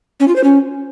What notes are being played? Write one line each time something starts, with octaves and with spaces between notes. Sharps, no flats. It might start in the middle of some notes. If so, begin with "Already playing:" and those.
C#4
F4
C5
C#4